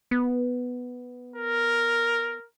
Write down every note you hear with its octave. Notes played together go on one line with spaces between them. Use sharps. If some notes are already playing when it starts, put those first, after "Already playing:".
B3
A#4